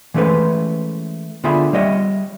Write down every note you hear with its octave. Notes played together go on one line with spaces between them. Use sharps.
E3 G#3 A3 C#4 B4 C5
D3 B3 F4 G#4 E5 B5
G3 C#5 D#5 E5